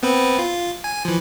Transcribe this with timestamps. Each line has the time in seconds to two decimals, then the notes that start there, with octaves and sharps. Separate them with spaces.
0.03 B3 C4 B4
0.39 F4
0.84 G#5
1.05 E3 F3